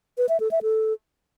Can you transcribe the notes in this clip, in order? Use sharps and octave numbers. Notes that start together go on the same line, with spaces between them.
B4
E5
A4
E5
A4